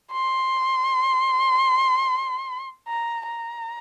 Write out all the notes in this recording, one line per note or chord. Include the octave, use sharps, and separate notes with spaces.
C6
A#5
A#5